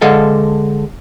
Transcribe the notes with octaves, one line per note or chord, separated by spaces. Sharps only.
D3 G#3 A4 F5